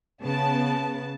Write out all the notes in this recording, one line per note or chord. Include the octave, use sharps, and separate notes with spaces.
C#3 B3 A5